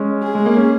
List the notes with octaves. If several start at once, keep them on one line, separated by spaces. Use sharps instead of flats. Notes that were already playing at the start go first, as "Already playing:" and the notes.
Already playing: G#3 C#4
G#4
G#3
A#3
C#4